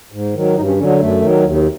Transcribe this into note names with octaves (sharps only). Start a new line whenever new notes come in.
G#2
D#3 F#3
G2 D#4
C#4
D3 F#3 C#4
D4
F#2 A3
D#3 F#3
D#2